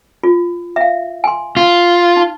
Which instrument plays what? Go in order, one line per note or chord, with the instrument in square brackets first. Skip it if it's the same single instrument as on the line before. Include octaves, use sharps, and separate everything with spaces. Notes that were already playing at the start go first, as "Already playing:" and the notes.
[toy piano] F4
E5 F5
G#5 C6
[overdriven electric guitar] F4
[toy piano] D#4